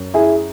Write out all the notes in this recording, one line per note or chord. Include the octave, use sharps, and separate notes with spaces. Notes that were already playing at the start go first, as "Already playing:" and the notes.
Already playing: F#2
E4 G#4